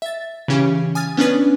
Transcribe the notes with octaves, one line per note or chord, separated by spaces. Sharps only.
E5 A6
C#3 E3 C#4 G4
G#5 D#6 F6 A6
B3 C#4 D4 B4